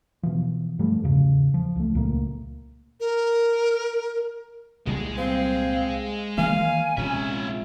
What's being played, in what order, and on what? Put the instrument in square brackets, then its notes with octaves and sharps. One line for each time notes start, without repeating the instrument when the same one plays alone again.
[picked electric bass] B2 E3 F3
G2 F3 G3 A3
E2 G#2 C#3
F3
C#2 A3
C#2 A#2 A3 A#3
[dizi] A#4
[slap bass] C2 A#2 G3 [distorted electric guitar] G#3 G#4
[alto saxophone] C4 [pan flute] F5
[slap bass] D#3 E3 A#3 [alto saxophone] F5 [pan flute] G#5
[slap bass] A#1 C3 G#3 [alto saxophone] C#4 [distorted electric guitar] F4 E5